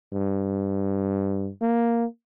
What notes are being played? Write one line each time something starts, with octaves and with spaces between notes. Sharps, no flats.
G2
A#3